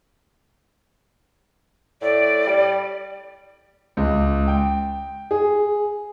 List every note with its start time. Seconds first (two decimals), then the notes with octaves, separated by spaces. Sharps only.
2.02 A2 D5
2.47 G3
3.97 C#2
4.48 G5
5.31 G#4